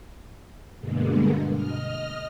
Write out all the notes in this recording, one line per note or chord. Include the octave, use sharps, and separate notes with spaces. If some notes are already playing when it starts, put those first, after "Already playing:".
G2 B2 D3 G#3 A#3 B3
D#5 F6